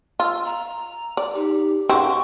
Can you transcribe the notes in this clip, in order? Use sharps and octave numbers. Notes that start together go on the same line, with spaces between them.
F4 E6
A#5
D5
D#4 G4
C#3 C4 G4 F#5 C6 C#6